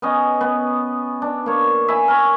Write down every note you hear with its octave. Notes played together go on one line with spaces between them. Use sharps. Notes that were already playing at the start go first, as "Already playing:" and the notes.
B3 C#4 D#5
B3
D4
A#3 C#5
E5 G#5 B5
A#4 C#5